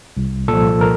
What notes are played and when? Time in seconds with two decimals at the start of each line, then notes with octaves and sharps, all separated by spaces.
0.17 C2
0.48 A#2 A4
0.53 F3
0.81 A#4